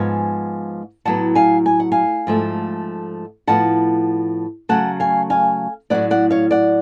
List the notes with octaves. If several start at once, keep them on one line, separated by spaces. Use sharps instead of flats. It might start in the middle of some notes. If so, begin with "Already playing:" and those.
Already playing: G#2 F3 B3 F5 G#5
A2 F#3 B3 F#5 A5
F5 G#5
G#5
F#5
F5 G#5
G#2 F3 A3
A2 F3 B3 F#5 A5
C#3 F#3 A3 F#5 A5
F5 G#5
F5 G#5
A2 F#3 B3 D5 F#5
D5 F#5
C#5 F5
D5 F#5